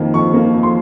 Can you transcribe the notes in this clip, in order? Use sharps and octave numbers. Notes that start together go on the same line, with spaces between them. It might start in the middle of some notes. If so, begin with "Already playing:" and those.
Already playing: F2 D#3 A#3
F2 C#6
A#3
F2
C6